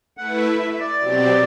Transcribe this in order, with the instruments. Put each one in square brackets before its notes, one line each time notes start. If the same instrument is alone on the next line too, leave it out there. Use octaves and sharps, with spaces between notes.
[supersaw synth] A3 E4 B4 [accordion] F#5
[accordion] E5
E5
E5
D5
[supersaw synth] B2 F#3 C4 G4